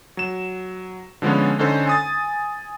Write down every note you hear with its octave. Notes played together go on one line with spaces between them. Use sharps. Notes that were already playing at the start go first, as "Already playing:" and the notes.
F#3 E7
D3 F3 G#3 B3 C#4
D3 C#4 D#4 A4 C5
G#5 D#6 A6